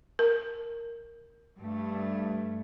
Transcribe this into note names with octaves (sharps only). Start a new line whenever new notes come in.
A#4
G2 A3